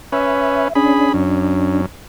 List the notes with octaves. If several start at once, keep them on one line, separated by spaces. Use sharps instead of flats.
C#4 B4 E5
C#4 D4 G#4 B5
F#2